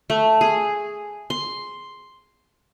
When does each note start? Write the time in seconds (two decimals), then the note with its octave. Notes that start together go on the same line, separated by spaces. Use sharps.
0.10 A3
0.41 G#4
1.30 C6